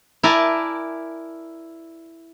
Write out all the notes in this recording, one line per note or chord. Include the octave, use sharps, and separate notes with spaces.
E4 A#4 D5 G#5 A5